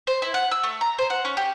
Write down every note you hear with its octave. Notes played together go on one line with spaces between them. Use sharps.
C5
E4
F#5
E6
A3
A#5
C5
F#5
C#4
G4